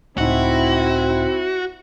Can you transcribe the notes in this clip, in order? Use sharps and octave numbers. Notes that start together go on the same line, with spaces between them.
C#2 A2 C4 D#4 E4 F#4